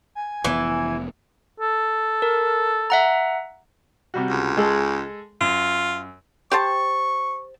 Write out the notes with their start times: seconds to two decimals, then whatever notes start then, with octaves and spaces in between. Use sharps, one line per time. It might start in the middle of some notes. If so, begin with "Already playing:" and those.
0.15 G#5
0.44 F1 E3 B3
1.60 A4
2.22 A#4
2.90 E5 F#5 A#5
4.14 C3 G3 F#4
4.30 C#2
4.57 G#3 G#4 A4
5.41 F#2 F4
6.51 G4 C5 A5 C#6